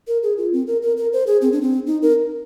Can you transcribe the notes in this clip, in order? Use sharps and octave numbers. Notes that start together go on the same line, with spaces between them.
A#4
G#4
F4
C4
A#4
A#4
A#4
C5
G#4
C4
D4
C4
D#4
A#4